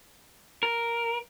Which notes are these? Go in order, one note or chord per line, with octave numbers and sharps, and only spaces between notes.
A#4